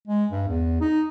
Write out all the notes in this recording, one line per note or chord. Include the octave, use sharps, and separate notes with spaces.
G#3
G2
E2
D#4